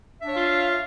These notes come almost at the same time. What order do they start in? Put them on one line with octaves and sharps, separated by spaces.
E5 D4 C#5 F5 F4